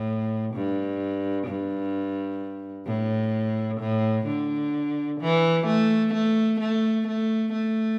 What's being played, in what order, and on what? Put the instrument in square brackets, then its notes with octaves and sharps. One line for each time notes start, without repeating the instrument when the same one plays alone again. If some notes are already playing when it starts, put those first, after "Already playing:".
Already playing: [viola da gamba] A2
G2
G2
A2
A2
D3
E3
A3
A3
A3
A3
A3